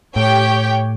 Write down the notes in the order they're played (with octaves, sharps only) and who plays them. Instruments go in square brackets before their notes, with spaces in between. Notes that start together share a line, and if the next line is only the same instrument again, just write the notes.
[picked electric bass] A2 [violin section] G4 C#5 G5